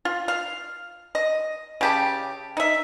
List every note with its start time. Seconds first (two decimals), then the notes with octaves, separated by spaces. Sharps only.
0.05 F4
0.28 F5
1.15 D#5
1.81 C#3 G4 A5
2.57 D#4 E5